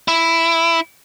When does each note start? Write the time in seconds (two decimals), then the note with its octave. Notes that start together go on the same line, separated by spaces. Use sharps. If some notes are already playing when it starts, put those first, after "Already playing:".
0.08 E4